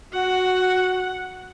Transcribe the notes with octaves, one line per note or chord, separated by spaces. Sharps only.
F#4 F#5